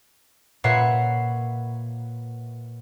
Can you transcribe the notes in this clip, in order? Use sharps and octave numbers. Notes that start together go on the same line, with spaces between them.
A#2 B4 C#5 E5 F#5 C7